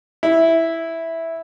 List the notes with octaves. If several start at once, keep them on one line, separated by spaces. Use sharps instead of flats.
E4